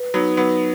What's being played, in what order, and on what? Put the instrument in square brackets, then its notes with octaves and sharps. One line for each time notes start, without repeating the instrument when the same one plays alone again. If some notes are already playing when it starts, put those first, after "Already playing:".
Already playing: [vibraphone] B4
[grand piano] F#3 B3 [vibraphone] D#4
[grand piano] F#3 B3 [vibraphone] B4